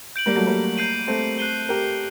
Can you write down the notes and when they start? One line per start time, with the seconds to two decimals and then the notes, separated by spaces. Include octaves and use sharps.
0.16 G6 D7 F#7
0.26 G3 A#3
0.36 F#3 A3
0.47 G3 A#3
0.78 G6 C7 D#7 F#7
1.07 A3 C4
1.39 F#6 C7 D#7 G7
1.69 G4 A#4